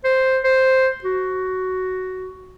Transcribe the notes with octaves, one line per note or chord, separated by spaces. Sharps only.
C5
C5
F#4